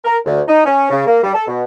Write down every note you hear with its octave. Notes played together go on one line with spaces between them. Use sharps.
A#4
D2
D#4
C#4
C#3
A#3
G3
A4
B2